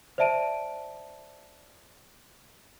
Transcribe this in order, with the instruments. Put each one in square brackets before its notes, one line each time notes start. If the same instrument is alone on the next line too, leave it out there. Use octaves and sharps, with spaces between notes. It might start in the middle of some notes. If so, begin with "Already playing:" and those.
[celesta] C5 D5 E5 A5 D7 D#7